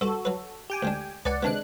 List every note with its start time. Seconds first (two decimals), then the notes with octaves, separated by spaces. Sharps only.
0.01 G2 F#4 A4
0.25 F#3 B4
0.70 G4 G5 G#5
0.83 D2 G#3 D4
1.25 C#2 B4 D5 F#5 G#5
1.43 C3 D#3 G#3 B3 D4 F#6